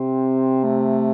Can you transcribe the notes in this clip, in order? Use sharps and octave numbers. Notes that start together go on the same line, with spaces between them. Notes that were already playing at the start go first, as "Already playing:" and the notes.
Already playing: C3 C4
A3